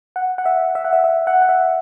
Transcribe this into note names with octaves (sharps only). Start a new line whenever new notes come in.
F#5
F#5
E5
E5
F#5
E5
E5
F#5
F#5
E5